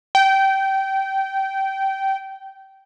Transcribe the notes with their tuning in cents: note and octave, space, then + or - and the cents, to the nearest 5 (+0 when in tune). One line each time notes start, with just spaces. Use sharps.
G5 -20